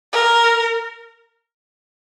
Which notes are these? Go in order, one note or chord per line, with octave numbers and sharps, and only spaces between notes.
A#4